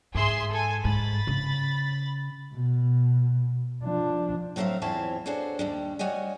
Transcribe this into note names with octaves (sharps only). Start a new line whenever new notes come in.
G#2 G#4 E5 C6
A4 G#5
G#2 B5 A6
C#3
B2
F3 D4
A2 F#3 C4 C5 E5 F5
E2 C4 E4 F4 C#5 A5
D4 F#4 G#4 A4 C5 C#5
D#2 G3 D4
G3 F#4 C#5 D#5 G#5